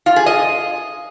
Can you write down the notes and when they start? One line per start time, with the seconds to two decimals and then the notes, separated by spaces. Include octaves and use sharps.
0.06 F4
0.16 G#4
0.26 D#5